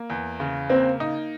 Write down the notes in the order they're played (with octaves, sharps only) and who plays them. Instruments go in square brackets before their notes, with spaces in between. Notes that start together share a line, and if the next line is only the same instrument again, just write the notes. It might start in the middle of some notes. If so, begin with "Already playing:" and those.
Already playing: [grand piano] A#3
E2
C#3
[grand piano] A#3 [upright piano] C4
[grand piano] D#4